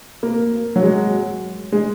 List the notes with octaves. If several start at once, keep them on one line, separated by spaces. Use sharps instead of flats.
A#3
F#3
G#3
G#3